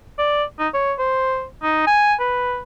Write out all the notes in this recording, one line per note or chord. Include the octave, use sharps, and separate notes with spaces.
D5
D#4
C#5
C5
D#4
G#5
B4